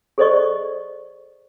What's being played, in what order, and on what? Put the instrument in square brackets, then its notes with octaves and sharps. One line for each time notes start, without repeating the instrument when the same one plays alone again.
[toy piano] G#4 A4 C5 D5 D#5 C#6